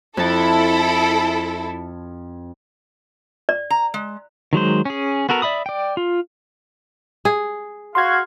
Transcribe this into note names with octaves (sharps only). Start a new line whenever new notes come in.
F2 E4 A4 A5
D5
A#5
G#3
D#3 F#3 G#3 C5
C#4 G#4
B3 F#4 A4 A#4
D5 E5 B5 D#6
D5 G5
F4
G#4
F#4 F5 C6 G#6